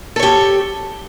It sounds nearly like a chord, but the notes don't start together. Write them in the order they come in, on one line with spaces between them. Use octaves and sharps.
A4 C#5 G4